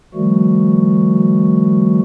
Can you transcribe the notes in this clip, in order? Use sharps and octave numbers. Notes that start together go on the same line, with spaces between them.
D#3 F3 G3 A3 F#4